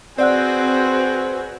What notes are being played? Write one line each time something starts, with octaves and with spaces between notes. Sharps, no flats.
C4 F#4 G#4 B4 D5 F#5 F#6